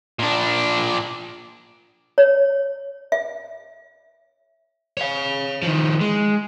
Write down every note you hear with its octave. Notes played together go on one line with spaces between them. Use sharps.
A#2 D4
C#5
E5
C#5 F5
D#3 F3
G#3